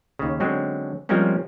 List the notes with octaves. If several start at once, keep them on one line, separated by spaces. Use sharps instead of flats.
D#2 C#3
D3 F#3 G#3 C4 C#4
F3 G3 G#3 A#3 C4 C#4